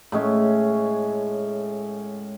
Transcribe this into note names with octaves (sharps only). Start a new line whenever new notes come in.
A2 G#3 C#4